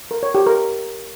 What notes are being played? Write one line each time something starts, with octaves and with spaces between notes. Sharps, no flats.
A#4
C#5
G4
A#4